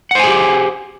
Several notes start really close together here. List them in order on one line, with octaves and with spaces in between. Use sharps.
F#5 C5 G#5 G#4 G4